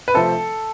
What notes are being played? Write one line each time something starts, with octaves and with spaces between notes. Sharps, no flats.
B4
C3 F3 A3 C4 A4